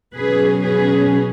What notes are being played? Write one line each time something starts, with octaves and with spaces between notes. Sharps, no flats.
B2 F#3 C#4 G#4 B4
G#4 B4